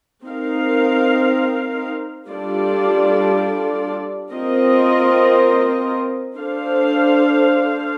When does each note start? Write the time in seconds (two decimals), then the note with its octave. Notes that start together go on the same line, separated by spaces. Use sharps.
0.25 C4 D#4 A#4 F5
2.28 G3 D4 F4 A4 D5
4.32 C4 F4 A#4 D#5
6.36 D4 A4 C5 F5